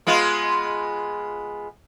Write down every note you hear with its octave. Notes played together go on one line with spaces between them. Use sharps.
G#3 B3 F4